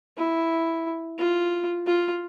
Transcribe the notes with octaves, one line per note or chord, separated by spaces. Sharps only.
E4
F4
F4